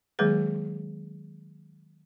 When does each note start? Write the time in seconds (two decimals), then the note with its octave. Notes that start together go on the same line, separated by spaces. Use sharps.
0.19 D#3 F#3 G#3 A#3 G#4 B4